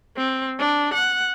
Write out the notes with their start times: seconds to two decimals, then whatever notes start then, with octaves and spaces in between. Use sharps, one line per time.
0.17 C4
0.60 D4
0.94 F#5